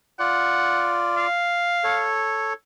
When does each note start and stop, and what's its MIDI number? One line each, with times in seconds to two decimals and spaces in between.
0.19 1.27 65
0.19 1.27 74
0.19 1.02 78
1.17 2.05 77
1.84 2.53 69
1.84 2.53 73